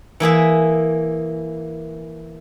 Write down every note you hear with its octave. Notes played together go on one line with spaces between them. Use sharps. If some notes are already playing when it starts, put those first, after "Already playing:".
E3 A#3 G#4 E5